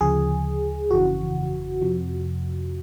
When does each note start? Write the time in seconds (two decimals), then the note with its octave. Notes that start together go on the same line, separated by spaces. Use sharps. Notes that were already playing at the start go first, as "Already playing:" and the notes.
0.01 D2 C#3 F3 G#4
0.91 G1 F2 C#3 E3 F#4
1.81 F2 C3 F3